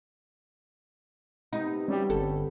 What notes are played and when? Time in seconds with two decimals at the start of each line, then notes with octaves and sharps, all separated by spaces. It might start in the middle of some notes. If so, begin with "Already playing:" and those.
1.53 C3 B3 D#4 B4
1.88 G3 C#4 G4 E5
2.10 G1 A4